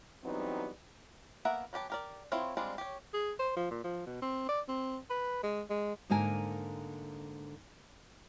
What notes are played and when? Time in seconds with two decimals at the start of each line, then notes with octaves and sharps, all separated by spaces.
0.23 E3 F#3 G3 B3 C4 D#4
1.45 A#3 B3 A#4 E5 F#5
1.73 F#3 B3 G4 A5
1.90 G4 A#4 D5
2.32 C4 E4 F4 C5 C#5
2.57 G3 G#3 C4 D4 F4
2.78 G4 C#5
3.14 G#4
3.39 C5
3.56 F3
3.71 A#2
3.84 F3
4.06 B2
4.22 C4
4.49 D5
4.68 C4
5.10 B4
5.43 G#3
5.70 G#3
6.10 G#2 D3 A#3 A#4 G#5